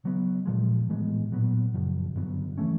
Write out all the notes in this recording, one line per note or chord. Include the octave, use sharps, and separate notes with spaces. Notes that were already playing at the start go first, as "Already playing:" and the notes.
C#3 F#3 B3
A#2 F3 G#3
A2 E3 G#3 B3
A#2 F#3 B3
F#2 C#3 F3
G2 D3 F#3 B3
E3 A3 C#4